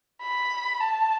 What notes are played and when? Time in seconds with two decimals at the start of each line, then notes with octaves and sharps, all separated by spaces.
0.23 B5
0.80 A5